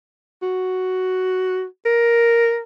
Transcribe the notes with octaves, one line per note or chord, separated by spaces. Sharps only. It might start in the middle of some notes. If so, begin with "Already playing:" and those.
F#4
A#4